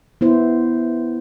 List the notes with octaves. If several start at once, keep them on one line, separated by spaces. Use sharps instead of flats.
B3 E4 C5